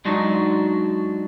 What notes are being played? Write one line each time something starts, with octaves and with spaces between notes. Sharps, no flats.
F#3 G#3 D4 D#4 F#4